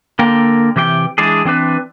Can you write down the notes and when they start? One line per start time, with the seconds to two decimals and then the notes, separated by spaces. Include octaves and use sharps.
0.19 D3 A#3 A#4 G5
0.76 C3 E3 G4 B4 G5
1.18 E3 G#3 D4 G#4
1.45 E3 C4 D4 B4